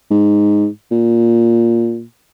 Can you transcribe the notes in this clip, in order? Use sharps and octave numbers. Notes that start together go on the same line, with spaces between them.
G#2
A#2